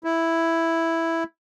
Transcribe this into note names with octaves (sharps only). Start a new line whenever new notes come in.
E4